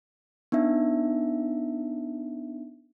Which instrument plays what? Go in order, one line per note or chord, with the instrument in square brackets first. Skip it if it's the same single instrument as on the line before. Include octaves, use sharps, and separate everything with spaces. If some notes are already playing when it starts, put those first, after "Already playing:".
[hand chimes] B3 D4 D#4 E5